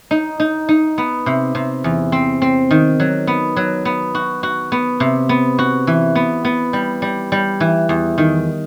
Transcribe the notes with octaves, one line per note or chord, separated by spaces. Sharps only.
D#4
D#4
D#4
B3
C3
C3
E2
C4
C4
D#3
F#3
B3
F#3
B3
F#4
F#4
B3
C3
B3
F#4
E3
B3
B3
G3
G3
G3
E3
E2
D#3